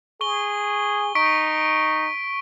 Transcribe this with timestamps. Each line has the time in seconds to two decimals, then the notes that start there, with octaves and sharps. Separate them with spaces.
0.21 G#4 C#6 G7
1.15 D#4 C#6 B6 D7